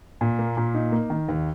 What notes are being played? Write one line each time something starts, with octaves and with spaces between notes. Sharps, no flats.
A#2
A#3
A#2
D#4
A#3
D#3
D#2